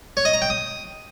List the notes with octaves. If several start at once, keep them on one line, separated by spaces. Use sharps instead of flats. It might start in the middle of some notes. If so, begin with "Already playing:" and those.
C#5
D#5
A#5
G5
D#6